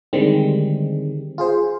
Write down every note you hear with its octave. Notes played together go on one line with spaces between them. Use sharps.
D3 D#3 G3 G#3 C4
F4 G#4 C5